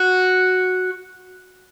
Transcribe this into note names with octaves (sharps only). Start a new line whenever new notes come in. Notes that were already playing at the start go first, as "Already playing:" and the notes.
Already playing: F#4